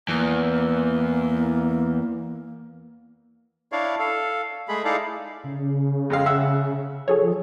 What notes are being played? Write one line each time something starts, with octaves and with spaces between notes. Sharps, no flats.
E2 A#3
D4 E4 C#5 D5 F5
A4 F5
G#3 A3 G#4 B5
D#4 E4 G#4 A4 D5 F5
C#3
F2 G#3 F5
E5 F#5 E6
F3 G#4 A4 C#5